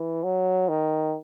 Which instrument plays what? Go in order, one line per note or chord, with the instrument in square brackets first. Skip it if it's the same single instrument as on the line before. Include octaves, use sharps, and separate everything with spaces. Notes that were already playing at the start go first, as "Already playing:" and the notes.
Already playing: [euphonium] E3
F#3
D#3